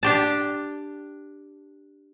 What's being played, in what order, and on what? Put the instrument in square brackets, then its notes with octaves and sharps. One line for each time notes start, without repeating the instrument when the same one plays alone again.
[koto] D4 G4 A5